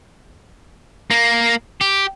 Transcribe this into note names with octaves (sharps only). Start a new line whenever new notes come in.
A#3
G4